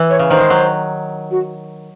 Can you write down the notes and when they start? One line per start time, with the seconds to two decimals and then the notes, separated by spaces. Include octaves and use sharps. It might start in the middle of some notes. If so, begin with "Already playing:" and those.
Already playing: E3
0.10 C#5
0.19 C#3
0.30 D#3 C5
0.41 G#3
0.50 F#3
1.31 F#4